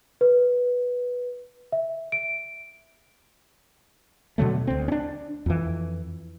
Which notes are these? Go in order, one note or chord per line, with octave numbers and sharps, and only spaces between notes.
B4
E5
D7
B2 D3 F#3 A3
D2 C4
C#4 D4
F2 E3